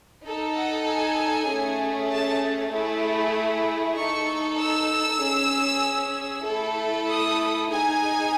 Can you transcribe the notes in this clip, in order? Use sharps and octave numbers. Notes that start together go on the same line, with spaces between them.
D#4 A4
F#5
G#5
A3 C#4 G#4
A5
A3 E4 G#4
D#4 A4 C#6
E6
C#4 G#4
A3 E4 A4
D#6
D#4 G#4 G#5